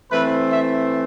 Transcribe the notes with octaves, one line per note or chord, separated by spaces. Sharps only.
E3 A3 C4 B4
E5